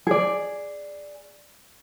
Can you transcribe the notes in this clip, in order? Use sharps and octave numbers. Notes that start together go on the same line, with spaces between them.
G#4 D5